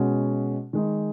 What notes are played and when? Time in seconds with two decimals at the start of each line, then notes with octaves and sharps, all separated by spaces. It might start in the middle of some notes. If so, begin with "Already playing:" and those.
Already playing: B2 G#3 C#4 F#4
0.73 D#3 G#3 D#4